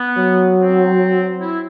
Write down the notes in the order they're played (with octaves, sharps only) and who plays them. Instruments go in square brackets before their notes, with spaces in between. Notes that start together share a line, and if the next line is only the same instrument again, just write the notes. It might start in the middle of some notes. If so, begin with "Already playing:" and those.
Already playing: [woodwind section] B3
[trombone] F#3
[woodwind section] C4
E4